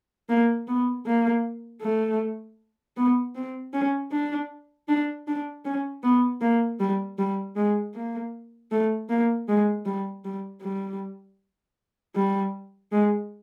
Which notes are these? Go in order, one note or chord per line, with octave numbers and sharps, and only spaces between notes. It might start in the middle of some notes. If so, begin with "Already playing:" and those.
A#3
B3
A#3
A3
B3
C4
C#4
D4
D4
D4
C#4
B3
A#3
G3
G3
G#3
A#3
A3
A#3
G#3
G3
G3
G3
G3
G#3